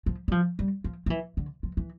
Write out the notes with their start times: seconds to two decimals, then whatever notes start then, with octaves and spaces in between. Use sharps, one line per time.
0.06 F3
0.28 G3
0.32 F3
0.59 G3
0.84 F3
1.06 F3
1.10 E3
1.37 D3
1.63 F3
1.77 E3